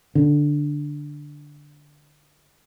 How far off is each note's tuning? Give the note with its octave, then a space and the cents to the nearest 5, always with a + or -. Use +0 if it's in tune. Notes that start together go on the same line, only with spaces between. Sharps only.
D3 +0